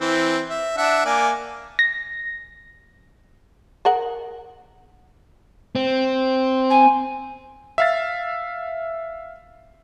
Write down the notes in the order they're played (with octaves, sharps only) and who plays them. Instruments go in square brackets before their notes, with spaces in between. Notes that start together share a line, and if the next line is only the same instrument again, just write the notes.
[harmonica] E3 C4
E5
D4 E5 F#5
A#3 D5 G#5
[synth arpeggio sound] A#6
[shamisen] G#4 A#4 F#5
[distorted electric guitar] C4
[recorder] G#5
[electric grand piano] E5 F5 A6